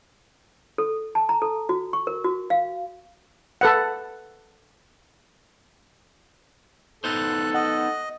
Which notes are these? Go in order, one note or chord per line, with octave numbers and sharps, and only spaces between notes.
A4
A5
A#5
A4
F#4
C#6
A#4
F#4
F5
A4 B4 F#5
B3 D#4 A4 C5 F#6
D#5 F#5